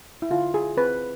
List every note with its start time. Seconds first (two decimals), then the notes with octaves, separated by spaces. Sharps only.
0.22 E4
0.30 D3 F4
0.54 G#4
0.77 C4 B4